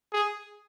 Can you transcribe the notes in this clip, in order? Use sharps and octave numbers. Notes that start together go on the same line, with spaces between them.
G#4